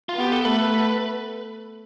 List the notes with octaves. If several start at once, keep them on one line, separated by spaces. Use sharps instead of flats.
F4
B3 G4
A4
A3 B4